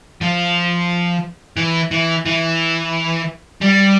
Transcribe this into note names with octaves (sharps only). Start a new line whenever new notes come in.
F3
E3
E3
E3
G3